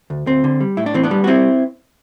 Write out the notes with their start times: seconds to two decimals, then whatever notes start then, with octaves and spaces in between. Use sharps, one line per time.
0.10 D2
0.27 D2 C4
0.44 D3
0.61 G3
0.77 A2 E4
0.86 D4
0.94 E3 C4
1.04 B3 D4
1.11 G3
1.24 F#4
1.27 C4 E4